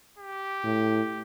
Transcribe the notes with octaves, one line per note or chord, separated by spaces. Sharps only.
G4
A2